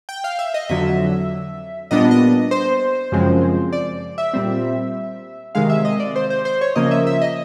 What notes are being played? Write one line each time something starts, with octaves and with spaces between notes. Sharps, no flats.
G5
F5
E5
D#5
F2 D3 F#3 E5
A#2 G3 B3 D4 D#5
D#5
C5
F#2 C#3 F3 G#3 C4
D5
E5
A#2 G3 C4
C3 D#3 G#3 F5
E5
D#5
D5
C5
C5
C5
C#5
C#3 F3 A#3 D#5
E5
E5
D#5